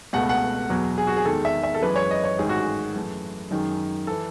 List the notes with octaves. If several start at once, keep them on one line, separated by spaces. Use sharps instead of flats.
C#2 B2 A3 F#5
F#5
E2 B2 F#3
G#4
F#4
G#4
E2 D#3 G#3 A4
E5
E5
A4
F#2 E3 G#3 B4
C#5
D#5
C#5
A1 G#2 D#3 G#4
F#4
G#4
F#2 E3 A3
F#2 D#3 G#3
E3 A4